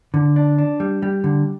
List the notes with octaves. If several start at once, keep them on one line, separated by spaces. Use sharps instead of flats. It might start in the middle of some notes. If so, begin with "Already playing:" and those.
D3
D4
D4
G3
G3
D3